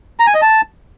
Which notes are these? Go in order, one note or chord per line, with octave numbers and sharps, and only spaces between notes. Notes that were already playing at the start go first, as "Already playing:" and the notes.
A#5
G#5
D#5
A5